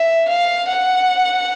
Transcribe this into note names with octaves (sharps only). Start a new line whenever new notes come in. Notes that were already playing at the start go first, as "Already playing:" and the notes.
Already playing: E5
F5
F#5